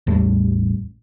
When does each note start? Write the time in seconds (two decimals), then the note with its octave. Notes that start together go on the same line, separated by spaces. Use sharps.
0.07 A1 E2 G3 A3